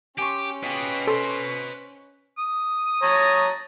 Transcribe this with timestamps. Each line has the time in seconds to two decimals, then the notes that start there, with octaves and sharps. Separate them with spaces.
0.18 C#4 G4 G#5 C6 C#6
0.63 F4 G4 G#4 B4 D#5
1.07 A4 C5
2.38 D#6
3.02 C#5 A5 A#5